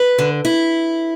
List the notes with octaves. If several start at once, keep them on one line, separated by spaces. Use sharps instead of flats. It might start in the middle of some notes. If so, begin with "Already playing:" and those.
Already playing: B4
D3
E4